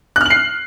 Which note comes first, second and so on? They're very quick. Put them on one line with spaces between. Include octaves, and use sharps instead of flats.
F#6 F6 F#7 C7